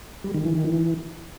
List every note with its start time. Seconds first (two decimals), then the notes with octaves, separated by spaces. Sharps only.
0.24 G3
0.34 D#3
0.45 E3
0.55 D#3
0.65 E3